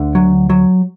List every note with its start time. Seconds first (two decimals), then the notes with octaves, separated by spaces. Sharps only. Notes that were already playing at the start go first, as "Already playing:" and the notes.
Already playing: D2 D3
0.15 F#3
0.50 F#3